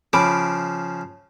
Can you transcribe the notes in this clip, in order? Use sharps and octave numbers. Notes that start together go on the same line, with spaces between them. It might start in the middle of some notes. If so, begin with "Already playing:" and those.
C#3 F3 B5 D6